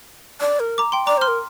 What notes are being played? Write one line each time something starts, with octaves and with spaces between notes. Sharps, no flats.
D5
A#4
A#5 D6
G5 C6
D5 A#5 D6
C5 C6 F6
A#4